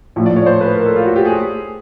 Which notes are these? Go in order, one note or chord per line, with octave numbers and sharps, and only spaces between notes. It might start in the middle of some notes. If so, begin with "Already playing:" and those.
A#1 A2 F3 A3
D5
C#5
C5
B4
A#4
A4
F4
F#4
G4
G#4